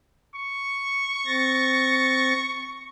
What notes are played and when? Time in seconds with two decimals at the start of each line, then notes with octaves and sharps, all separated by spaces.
0.36 C#6
1.26 C4 A6 A#6